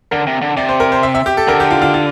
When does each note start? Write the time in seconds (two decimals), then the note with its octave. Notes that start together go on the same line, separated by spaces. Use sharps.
0.11 D3 A#4
0.27 C3
0.42 D3
0.57 C3 D5
0.69 C5
0.80 A#4
0.92 C5
1.03 E5
1.15 E5
1.26 G4
1.37 A4
1.48 D3 A#4
1.60 G4
1.71 F4
1.82 F4
1.94 F4